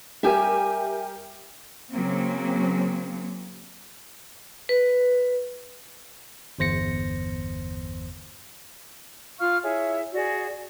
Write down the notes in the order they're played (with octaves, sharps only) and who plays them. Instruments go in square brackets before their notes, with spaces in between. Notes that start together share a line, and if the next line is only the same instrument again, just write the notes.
[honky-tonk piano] G3 G4 A#4 [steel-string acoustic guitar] E5 G#5
[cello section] C#3 F#3 A#3 C4
[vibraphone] B4
[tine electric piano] G1 E2 C5 A#6 C#7
[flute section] F4 F5 C#6 F6
E4 G#4 C#5 E5
F#4 G#4 D5